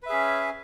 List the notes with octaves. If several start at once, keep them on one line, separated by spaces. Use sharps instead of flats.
C#4 G#4 B4 E5